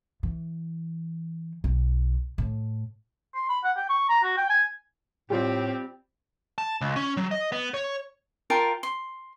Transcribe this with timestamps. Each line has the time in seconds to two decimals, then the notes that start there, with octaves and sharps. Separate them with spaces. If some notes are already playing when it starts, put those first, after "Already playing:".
0.23 E3
1.64 B1
2.38 A2
3.35 C6
3.49 B5
3.64 F#5
3.77 G5
3.89 C#6
4.09 A#5
4.24 F#4
4.37 G5
4.50 G#5
5.30 A2 G3 C4 F4 G4
6.58 A5
6.81 C#2
6.96 C#4
7.17 F#3
7.31 D#5
7.52 B3
7.74 C#5
8.50 F4 A#4 G5 A5
8.83 C6